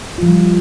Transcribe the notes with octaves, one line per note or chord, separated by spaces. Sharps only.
F3 G3 F4